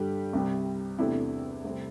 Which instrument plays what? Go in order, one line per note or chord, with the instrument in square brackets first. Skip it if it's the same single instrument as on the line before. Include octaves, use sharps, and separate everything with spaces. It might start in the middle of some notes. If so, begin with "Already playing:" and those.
Already playing: [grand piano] G2 D3 G3 G4
C2 C3 G3
E2 C3 A3 D4 E4
C2 C3 A3 C4